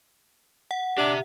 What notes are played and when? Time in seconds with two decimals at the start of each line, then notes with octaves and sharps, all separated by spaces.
0.71 F#5
0.98 D4 G4 E5